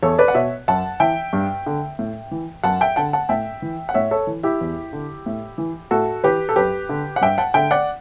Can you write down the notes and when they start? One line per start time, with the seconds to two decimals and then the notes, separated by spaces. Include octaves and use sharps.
0.03 E2 A4 C#5
0.19 B4 D5
0.28 F#5
0.35 B2 C#5 E5
0.68 F#2 F#5 A5
1.00 E3 E5 G5
1.33 G2
1.66 D3
1.99 A2
2.31 E3
2.63 F#2 F#5 A5
2.81 E5 G5
2.96 D3 F#5 A5
3.13 F#5 A5
3.29 A2 E5 G5
3.62 E3
3.89 F#5
3.94 A2 C#5 E5
4.11 A4 C#5
4.27 E3
4.43 E4 G4
4.61 E2
4.93 D3
5.26 A2
5.58 E3
5.91 A2 F#4 A4
6.24 E3 G4 B4
6.49 A4
6.56 F#2 G4 B4
6.89 D3
7.16 F#5
7.21 G2 E5 G5
7.38 F#5 A5
7.54 D3 E5 G5
7.71 D5 F#5